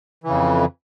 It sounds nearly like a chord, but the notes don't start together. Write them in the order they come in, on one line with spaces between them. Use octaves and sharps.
E3 C#3 F2